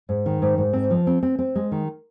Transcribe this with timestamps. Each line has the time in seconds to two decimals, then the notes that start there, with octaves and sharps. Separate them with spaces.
0.09 G#2
0.26 D#3
0.42 G#2
0.58 G#2
0.73 C4
0.90 F3
1.07 C4
1.23 C4
1.39 C4
1.55 G#3
1.72 D#3